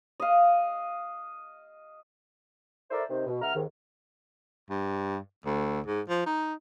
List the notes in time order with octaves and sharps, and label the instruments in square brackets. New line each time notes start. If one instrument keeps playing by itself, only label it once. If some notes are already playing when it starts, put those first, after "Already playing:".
[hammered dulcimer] D#5 F5
[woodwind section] E4 A4 A#4 C5 D5 E5
C3 D#3 C5
B2
C#2 E5 F#5 A#5 F6
D#2 G#2 D#3
[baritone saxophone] G2
D2
G#2
F3
D#4